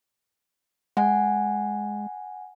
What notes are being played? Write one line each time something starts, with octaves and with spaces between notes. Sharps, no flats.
G#3 F#5 G#5